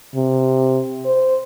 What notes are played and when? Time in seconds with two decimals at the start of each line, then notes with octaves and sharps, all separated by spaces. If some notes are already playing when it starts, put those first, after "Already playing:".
0.15 C3
1.05 C5